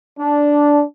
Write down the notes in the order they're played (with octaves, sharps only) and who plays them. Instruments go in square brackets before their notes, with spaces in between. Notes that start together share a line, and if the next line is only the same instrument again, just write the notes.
[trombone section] D4